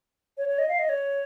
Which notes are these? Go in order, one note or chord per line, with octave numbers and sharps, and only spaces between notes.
C#5
C#5
D#5
F5
D#5
C#5